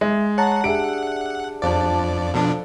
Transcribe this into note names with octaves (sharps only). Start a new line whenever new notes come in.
G#3 E5
C#5 F#5 A5 A#5
D4 G4 G#4 E5 D7
F2 F3 D4 D5
B2 F3 D4 A4